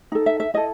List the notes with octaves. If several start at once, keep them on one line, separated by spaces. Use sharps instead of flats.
D#4 A4
E5
E5
E4 A4 D#5